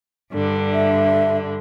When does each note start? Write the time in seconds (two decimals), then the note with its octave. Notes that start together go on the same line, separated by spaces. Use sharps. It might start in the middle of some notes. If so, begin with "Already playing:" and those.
0.31 G2 D3
0.73 E5